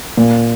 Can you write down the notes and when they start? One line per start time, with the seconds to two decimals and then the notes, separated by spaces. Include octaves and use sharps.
0.17 A#2